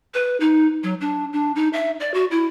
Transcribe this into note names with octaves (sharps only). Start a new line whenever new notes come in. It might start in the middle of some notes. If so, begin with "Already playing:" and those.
B4
D#4
F#3
D4
D4
D#4
E5
D5
F#4
E4